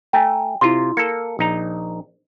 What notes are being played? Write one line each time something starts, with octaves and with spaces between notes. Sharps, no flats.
A3 G5 G#5 A#5
C3 E4 F4 C6
A#3 A4 C#7
A#1 D#4 A#5